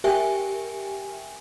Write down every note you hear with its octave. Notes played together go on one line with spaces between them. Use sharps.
G4 A#4 E5 G5 G#5